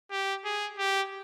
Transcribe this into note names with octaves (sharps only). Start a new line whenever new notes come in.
G4
G#4
G4